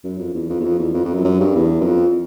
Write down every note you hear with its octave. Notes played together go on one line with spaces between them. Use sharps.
F#2
F2
E2
F2
E2
F2
E2
F2
F2
F#2
F#2
G2
E2
F#2
F2